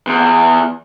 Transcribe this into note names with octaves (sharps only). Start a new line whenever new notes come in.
E2